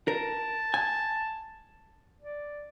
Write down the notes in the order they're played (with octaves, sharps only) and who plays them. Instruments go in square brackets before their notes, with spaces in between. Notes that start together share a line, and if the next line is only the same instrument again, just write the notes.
[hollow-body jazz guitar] A#4 [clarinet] A5
[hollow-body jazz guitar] G#5
[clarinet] D5